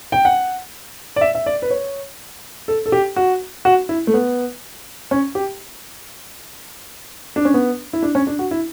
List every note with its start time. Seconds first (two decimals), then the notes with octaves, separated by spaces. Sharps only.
0.12 G5
0.25 F#5
1.16 D5
1.21 E5
1.35 E5
1.46 D5
1.62 B4
1.70 C#5
2.68 A4
2.86 A4
2.92 G4
3.16 F#4
3.65 F#4
3.89 E4
4.07 A3
4.14 B3
5.11 C#4
5.35 G4
7.36 D4
7.45 C#4
7.54 B3
7.93 E4
8.02 D4
8.15 C#4
8.27 D4
8.39 F#4
8.51 E4